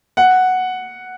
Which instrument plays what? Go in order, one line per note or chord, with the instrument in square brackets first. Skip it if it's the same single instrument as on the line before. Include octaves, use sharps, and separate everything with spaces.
[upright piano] F#5